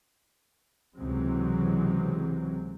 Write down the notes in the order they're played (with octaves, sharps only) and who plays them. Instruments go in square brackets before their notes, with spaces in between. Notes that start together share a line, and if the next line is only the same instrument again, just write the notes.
[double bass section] C#2 C3 E3 F#3 G#3 C4